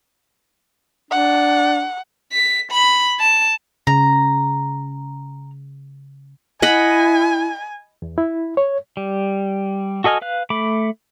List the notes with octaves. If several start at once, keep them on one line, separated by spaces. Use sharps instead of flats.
D4 F#5
B6
B5
A5
C#3 A#5
E4 D#5 F#5 G#5 B5
E2
E4
C#5
G3
F#4 A4 D#5 G#5 F6
B4 F5 F#6
A3 B5 D6